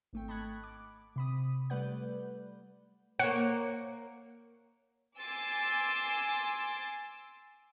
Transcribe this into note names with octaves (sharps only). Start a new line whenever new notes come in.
G#1 A3 G5
D#5 A5 B5 C#6 F#6 G#6
D6
C3 B5 D#6
G3 A3 B4 D5 F#5 G6
A#3 C#5 F#5
G#5 C6 D6 E6 A6